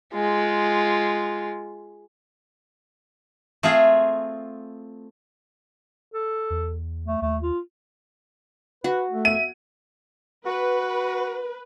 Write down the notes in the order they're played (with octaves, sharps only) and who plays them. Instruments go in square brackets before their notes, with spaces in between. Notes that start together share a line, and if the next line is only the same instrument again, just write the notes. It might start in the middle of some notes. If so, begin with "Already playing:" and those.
[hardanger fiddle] G#3 F4
[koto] A3 C4 F4 G#4
[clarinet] A4
[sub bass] E2
[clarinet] A3
[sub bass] D#2 [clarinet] A3
[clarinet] F4
[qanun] F#4 [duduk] B4
[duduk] A3
[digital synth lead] E5 [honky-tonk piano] D#7
[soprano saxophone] F#4 [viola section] B4